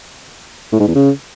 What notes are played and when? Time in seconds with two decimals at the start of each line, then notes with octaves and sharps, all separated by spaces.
0.73 A2
0.80 G#2
0.88 E2
0.95 C#3